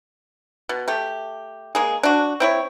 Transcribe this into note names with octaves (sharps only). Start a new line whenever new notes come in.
B2
A3 G4
G#3 A#3 G#4
D4 F#4
C4 E4 C#5